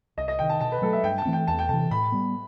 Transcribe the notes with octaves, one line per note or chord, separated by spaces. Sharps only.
C2 D#5
D#5
C3 D#3 G5
A5
B2 A5
B4
F#3 A3 A4
E5
G2 G5
A5
E3 A3 C4
G5
E2 A5
G5
C3 E3 A5
A2 B5
G3 B3